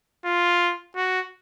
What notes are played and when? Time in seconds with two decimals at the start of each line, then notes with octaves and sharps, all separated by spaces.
0.25 F4
0.96 F#4